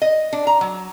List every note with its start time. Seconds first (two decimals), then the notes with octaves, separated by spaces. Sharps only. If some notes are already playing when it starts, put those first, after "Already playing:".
0.02 D#5
0.33 D4
0.47 A#5
0.61 F#3